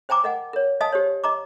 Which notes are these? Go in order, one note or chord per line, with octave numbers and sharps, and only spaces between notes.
C5 G5 G#5 A#5 D6
A#4 D#5 F#5 G#5
A#4 C#5
D#5 F5 G#5 A5 D#6
G4 C5 C#5
D#5 A#5 D6